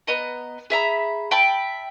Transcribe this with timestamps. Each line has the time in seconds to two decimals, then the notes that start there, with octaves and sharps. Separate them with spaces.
0.07 B3 D#5 A#5
0.70 G#4 E5 A#5 B5
1.31 E5 G5 A5 B5